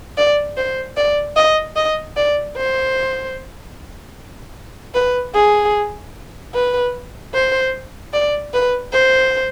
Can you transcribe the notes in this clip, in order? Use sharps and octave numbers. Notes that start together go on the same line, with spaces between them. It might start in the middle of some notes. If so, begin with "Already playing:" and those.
D5
C5
D5
D#5
D#5
D5
C5
B4
G#4
B4
C5
D5
B4
C5